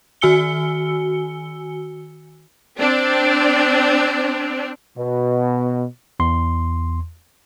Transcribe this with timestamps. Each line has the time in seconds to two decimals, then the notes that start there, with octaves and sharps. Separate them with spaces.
0.21 D#3 F#4 G#5 E6 C#7 G7
2.80 C4 D4
4.98 B2
6.20 E2 C6